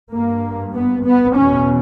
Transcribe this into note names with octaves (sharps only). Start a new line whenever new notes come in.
G2 A#3
B3
B3
E2 B2 C#4